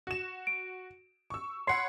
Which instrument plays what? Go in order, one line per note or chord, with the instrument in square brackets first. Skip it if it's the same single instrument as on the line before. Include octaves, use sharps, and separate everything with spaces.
[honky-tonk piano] F#4 E7
[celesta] D7
[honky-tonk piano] C#6 E6
[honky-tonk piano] C#5 F#5 B5 [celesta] C6 C7